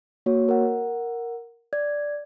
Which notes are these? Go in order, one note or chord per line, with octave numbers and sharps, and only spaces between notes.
A#3 F#4 C#5
A#4 F#5
D5 G#6